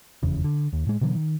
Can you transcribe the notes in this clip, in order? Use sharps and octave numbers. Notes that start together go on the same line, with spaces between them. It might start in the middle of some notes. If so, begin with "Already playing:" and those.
F1 E2 C#3
D3
D#2
A2 G#3
B2 D3 E3 F#3
D#3